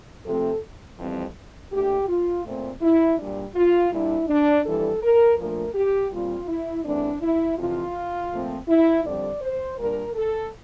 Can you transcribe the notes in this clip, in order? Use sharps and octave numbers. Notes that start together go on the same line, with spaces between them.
C3 F3 A3 C4 A4
F2 E3 G3 C4
A#2 A3 D4 G4
F4
A#2 A3 C4
E4
A#2 G3 D4
F4
A#2 G3 D4 E4
D4
F2 E3 G3 D4 A4
A#4
A#2 F3 A3 D4 A#4
G4
A#2 G3 C4 F4
E4
E2 E3 A3 C4 D4
E4
F2 C3 E3 F4
A#2 F3 A3 C4
E4
F2 D3 G3 C4 D5
C5
A#2 G3 D4 A#4
A4